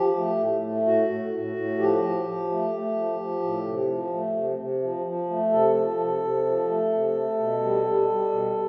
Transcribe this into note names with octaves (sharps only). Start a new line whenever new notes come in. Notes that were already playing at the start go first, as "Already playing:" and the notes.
Already playing: F3 G4
A3
A2
A3
A2 F#4
A2
A2
A2
F3 G4
F3
F3
A3
A3
F3
F3
A2
C3
F3
A3
C3
C3
F3
F3
A3
C3 A4
F3
C3
C3
F3
A3
C3
A3
B2
G3
G3
G3
B2